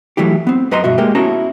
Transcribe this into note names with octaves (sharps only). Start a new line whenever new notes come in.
E3 F#3 A3 E4 G4
B3 C4
F#2 B4 D#5 A#5 C6
G2 B2 F#4 E5
G#3 A#3 G4
B3 C#4 E4 F#4 A5 A#5